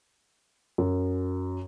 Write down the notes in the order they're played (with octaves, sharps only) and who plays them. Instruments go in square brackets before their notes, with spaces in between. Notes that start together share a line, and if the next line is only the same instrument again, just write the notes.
[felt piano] F#2